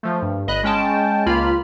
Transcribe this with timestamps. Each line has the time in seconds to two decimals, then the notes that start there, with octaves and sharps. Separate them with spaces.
0.03 F3 A3
0.22 G2
0.47 G1 D#5 B5 F#6
0.63 G#3 C#4 G5 A5
1.26 C#2 A#3 F4 B5 F6